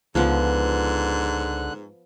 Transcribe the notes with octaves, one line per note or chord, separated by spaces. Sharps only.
C#2 G#2 D3 F3 B3 F#6